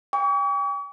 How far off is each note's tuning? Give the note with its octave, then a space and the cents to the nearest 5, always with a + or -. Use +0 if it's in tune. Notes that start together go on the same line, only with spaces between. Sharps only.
G5 +35 C#6 +45